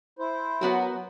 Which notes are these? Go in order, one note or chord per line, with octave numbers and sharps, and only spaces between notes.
E4 C5
F#3 B3 F#4 A#4